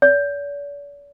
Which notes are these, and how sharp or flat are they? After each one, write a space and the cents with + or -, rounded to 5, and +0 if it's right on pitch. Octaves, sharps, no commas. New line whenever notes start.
D5 -45